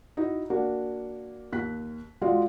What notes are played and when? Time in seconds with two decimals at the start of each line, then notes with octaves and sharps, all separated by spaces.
0.17 D#4 E4 F#4
0.50 A#3 D4 F#4
1.52 D#2 F#6 B6
2.22 G#3 F4 F#4 D5 F5